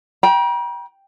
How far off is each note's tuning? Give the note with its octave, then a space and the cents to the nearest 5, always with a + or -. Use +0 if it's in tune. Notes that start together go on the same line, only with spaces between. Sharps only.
G5 +0 A#5 +45